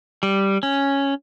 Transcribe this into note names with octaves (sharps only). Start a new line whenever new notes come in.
G3
C#4